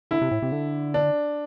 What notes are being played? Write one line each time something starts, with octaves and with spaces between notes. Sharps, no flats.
D3 E4
C3
A2
C3
D3
D4